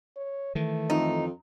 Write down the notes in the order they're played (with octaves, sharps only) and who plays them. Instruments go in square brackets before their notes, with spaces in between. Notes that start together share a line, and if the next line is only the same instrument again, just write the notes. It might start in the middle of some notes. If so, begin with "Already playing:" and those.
[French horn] C#5
[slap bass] D#3 E3 [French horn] A3
[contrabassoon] F2 [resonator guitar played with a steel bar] D#4